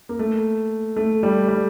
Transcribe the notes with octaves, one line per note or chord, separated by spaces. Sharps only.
A#3
A3
A3
G3
G3